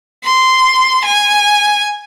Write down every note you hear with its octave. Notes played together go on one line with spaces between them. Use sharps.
C6
G#5